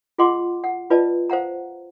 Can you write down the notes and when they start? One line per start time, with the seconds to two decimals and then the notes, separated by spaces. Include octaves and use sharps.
0.18 F4 G#4 D#5 F#5 C6 D6
0.64 F#5
0.90 F4 B4 D5 D#5 A5
1.30 C5 F5 F#5 A#5